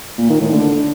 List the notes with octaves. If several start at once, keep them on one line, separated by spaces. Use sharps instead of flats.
A#2
D#3
A2
D3